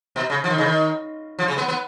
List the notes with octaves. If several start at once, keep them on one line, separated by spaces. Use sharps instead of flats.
B2
C#3
F3
D#3
C#3
D#3
F3
C#3
B3
B3